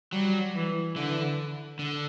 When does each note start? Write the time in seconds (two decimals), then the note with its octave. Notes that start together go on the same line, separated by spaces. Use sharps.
0.13 F#3 G3
0.55 E3
0.96 D3 E3
1.79 D3